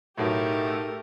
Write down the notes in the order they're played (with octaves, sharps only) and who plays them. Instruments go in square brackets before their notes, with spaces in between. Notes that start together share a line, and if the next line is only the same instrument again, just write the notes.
[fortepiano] B1 A2 [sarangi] A3 [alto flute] D#4 [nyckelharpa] G4 A#4